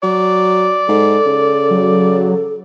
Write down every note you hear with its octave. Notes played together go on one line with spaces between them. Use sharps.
F#3 D5
G#2 A4
C#3
F#3